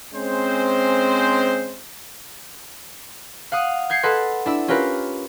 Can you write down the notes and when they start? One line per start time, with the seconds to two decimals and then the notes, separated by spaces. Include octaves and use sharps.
0.15 G#3 C4 C#4 C5
3.52 F5 F#5 D#6
3.90 G6 G#6 C7 C#7
4.03 A4 B4 D#5 F#5 C6
4.46 D4 E4 E6
4.68 C#4 F4 G4 A#4 B4